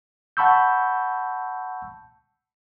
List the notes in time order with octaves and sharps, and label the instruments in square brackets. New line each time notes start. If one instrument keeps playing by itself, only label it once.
[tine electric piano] F#5 A5 B5 C#6 E6 G6